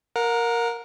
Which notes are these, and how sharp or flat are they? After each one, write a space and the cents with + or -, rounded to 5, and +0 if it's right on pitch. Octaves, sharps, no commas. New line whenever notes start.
A#4 +0 F#5 -40